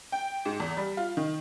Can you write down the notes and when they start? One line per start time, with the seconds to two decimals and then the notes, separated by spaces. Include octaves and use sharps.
0.12 G5
0.45 G#2
0.60 E2
0.77 G3
0.97 F4
1.17 D#3